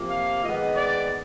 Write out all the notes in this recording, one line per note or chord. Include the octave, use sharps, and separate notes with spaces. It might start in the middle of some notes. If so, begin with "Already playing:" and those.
Already playing: C3 F3 A#3
F5
D#3 G#3 B3 D#5
D5